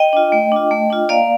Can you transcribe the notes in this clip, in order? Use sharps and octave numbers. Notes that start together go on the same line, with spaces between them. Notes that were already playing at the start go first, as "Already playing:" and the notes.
Already playing: D#5 G5
D4 F4
A3
D4 F4
A3
D4 F4
A#3 D5 F5